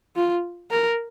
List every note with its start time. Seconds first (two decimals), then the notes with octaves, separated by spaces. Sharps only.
0.16 F4
0.71 A#4